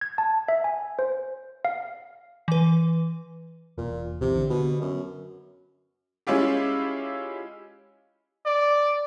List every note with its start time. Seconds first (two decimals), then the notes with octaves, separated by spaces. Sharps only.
0.01 G#6
0.18 A5
0.48 E5
0.64 G#5
0.99 C5
1.65 F5
2.48 E3 B4
3.78 E1 A#2
4.21 A#1 C3 E3
4.37 D3
4.50 B2
4.81 F#2
6.27 G#3 C#4 E4 F4 G4
8.46 D5